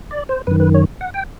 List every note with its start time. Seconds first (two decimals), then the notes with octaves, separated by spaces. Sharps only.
0.11 D5
0.29 C5
0.47 F#2 D#3 B4
0.60 B4
0.74 C#5
1.01 F#5
1.14 G5